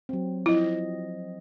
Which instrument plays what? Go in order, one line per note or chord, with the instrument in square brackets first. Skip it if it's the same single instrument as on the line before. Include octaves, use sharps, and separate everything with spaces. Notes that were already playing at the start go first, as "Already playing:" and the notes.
[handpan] F#3 C4
[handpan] F3 D#5 [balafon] E4